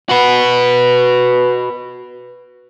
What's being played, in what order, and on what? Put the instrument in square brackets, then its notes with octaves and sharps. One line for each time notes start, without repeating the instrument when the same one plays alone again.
[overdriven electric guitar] F#4 B4